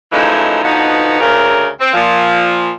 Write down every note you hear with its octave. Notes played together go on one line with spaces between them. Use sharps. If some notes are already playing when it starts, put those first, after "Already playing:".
F#2 E3 F3 G#3 A3 D#4
B2 D3 F3 B3 D#4
D2 C#3 A#4
C4
A#2 F3